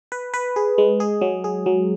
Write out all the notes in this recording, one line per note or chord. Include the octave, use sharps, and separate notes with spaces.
B4
B4
G#4
G#3
G#4
F#3
G#4
F#3